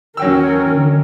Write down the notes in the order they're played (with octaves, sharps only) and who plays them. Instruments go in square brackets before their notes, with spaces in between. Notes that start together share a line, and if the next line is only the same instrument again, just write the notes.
[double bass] D#2 E3 [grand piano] F#3 G5 E6 [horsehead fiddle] C#4 A#4
[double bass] D3 D#3